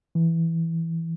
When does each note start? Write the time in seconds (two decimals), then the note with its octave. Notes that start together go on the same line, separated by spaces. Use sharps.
0.15 E3